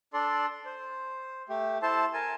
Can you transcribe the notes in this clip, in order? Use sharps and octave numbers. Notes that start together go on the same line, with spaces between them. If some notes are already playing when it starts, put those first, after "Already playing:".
D4 A4 D5 C6
C5
A3 G4
E4 A4 C5 A5 C6
A#4 G#5 A5